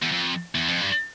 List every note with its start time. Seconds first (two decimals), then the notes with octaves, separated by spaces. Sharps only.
0.03 E2
0.12 F2
0.55 E2
0.68 F2
0.81 G2